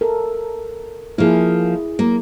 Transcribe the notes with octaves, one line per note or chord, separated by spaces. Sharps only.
A4 A#4
F3 A#3 E4 G#4
F#3 A#3